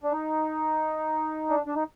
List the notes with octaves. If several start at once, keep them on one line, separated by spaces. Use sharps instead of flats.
D4
D#4
D4
D4
D#4